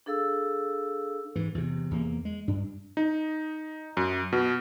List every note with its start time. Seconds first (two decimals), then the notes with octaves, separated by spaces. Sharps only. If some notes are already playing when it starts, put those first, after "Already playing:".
0.06 D4 G#4 A4 F5 E6
1.36 G#2 E3
1.55 E2 C3
1.91 E2 A#3
2.25 G#3
2.48 G2 D4
2.97 D#4
3.97 F#2
4.33 B2